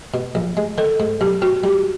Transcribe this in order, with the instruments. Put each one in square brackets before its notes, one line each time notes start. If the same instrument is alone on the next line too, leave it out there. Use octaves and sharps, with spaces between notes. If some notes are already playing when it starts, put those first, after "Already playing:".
[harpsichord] B2
A#1
G#3
[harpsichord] D#3 [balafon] A4
[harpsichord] G#2
[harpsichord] B1 [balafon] G4
[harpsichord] C4 [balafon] F#4
[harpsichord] G3 [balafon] G4